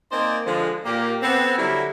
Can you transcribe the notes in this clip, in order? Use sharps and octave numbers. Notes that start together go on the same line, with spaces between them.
A#3 C4 D#4 C5 D5 G#5
D3 F3 G#3
A#2 A#3 G4
B3 C4 A4
D3 F#3 G3 E4 A#4 E5